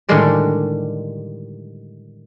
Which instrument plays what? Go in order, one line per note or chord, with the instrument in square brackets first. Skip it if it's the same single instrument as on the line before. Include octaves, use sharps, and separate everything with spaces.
[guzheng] A2 D3 D#3 G3 G#3 D5